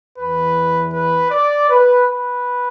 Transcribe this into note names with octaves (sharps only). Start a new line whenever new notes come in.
E2 E3 B4
B4
D5
B4
B4